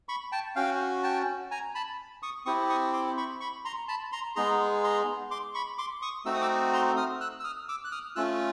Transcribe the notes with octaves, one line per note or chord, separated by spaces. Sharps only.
B5 C#6
G5 A5
C#4 F#4 F5 G5
G5 A5
G#5 A#5
A5 B5
C#6 D#6
C4 E4 G4 C#6 D#6
C#6 D#6
C6 D6
B5 C#6
B5 C#6
A#5 C6
A5 B5
A#5 C6
G#3 B3 D#4 G#4 A#5 C6
A#5 C6
C6 D6
B5 C#6
C6 D6
C#6 D#6
A3 C4 D#4 F#4 E6
D#6
D6 E6
A#5 C6
D#6 F6
E6 F#6
E6
D#6 F6
D6 E6
F#6
D#6 F6
A3 C#4 F4 E6 F#6